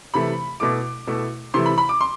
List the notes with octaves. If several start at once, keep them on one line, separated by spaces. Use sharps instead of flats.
C3 E3 A3 B5
B2 A3 E4 D6
B2 A3 E4
C3 E3 A3 E4 C6
B5
B5
D6
C6